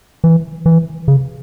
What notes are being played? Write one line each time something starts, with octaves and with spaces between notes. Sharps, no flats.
E3
E3
C#3